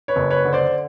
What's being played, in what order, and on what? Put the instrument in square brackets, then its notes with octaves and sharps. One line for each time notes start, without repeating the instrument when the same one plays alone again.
[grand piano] B4 C#5
F#1
B4 C#5
D3
C5 D5